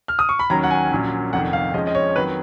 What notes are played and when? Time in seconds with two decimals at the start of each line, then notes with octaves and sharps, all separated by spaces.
0.08 F6
0.19 D#6
0.29 C#6
0.39 B5
0.50 D#2 D#3 F#3 C#4 A#5
0.63 F#5
0.71 G#5
0.91 A#1 A#2 F#3 C#4
1.33 F1 F2 D#3 F#5
1.53 F5
1.74 F2 F3 G#3 C#4 D#5
1.87 D#5
1.95 C#5
2.16 F2 D#3 F#3 B4